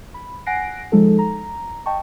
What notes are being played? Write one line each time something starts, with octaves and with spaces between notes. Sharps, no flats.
B5
F#5 G#5 F#6 A#6 C7 D7
F3 G#3 D#4 A4
A#5
D#5 G5 A5 C#6